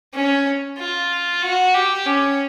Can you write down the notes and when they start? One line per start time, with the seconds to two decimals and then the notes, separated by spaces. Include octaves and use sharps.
0.14 C#4
0.78 F4
1.42 F#4
1.74 G4
2.06 C#4